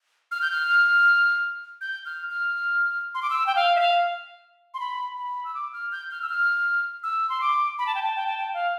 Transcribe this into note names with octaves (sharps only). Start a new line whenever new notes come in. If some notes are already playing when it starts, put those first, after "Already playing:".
F6
G6
F6
G6
F6
F6
C6
D6
E6
G5
F5
E5
F5
C6
B5
B5
E6
D6
F6
G6
F6
E6
F6
E6
C6
D6
B5
A5
G5
A5
G5
A5
G5
F5